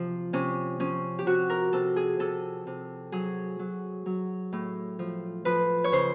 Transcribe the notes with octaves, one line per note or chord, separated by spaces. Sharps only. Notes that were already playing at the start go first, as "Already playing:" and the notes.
Already playing: C3 F3
C3 C#4
F3 C#4
G4
C3 F#4
A#4
C3 A4
G#4
C3 A4
C3
F#3 G#4
F#3
F#3
A2
F3
F3 B4
C#5
C#3 C5